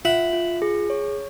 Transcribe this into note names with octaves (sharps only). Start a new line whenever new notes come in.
F4 E5 F#5
F4
G#4
C#5